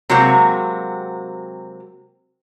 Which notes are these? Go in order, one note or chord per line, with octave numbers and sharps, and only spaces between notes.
C3 F#3 G#3 A#3 C4 F#4